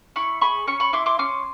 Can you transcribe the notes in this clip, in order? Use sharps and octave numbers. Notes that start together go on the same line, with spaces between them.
E4 B5 C#6
G#4 B5 C#6
C#4 B5 C#6
B5 C#6
E4 C6 D6
C6 D6
C#4 C6 D6